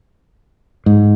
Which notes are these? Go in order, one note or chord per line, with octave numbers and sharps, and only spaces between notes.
G#2